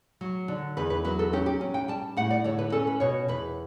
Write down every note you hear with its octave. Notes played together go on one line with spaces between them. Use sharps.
F#3
D3
E2 B4
B4
F#3 B4
A4
C#4 G4
G4
C#4
G5
G3 A5
A2 F#5
D5
D3 C#5
B4
C#4 A4
B4
B2 C#5
E2 B4